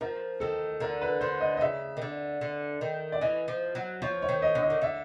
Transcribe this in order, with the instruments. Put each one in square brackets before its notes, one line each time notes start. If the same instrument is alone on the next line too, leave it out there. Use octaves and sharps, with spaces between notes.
[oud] F3 [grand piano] A#4
[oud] D#3 [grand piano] A4
[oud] D3 [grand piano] A#4
[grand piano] B4
[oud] D3 [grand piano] C5
[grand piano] D#5
D#5
[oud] C#3 [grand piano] E5
[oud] D#3
D3
D3
D#3
[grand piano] D5
[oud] E3 [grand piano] D#5
[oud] F3
F#3
[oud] F3 [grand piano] C#5
[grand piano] C#5
[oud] D#3
[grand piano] D#5
[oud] D3
[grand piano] D#5
[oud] D#3
[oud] D3 [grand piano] E5